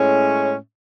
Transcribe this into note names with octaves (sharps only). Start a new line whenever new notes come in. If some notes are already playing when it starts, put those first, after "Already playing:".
Already playing: A2 G#3 C#4